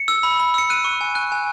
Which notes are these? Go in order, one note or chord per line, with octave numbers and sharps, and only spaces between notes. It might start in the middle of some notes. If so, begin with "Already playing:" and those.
Already playing: C#7
E6
B5
B5
E6 C#7
F#6 D#7
C#6
G#5
F#6
G#5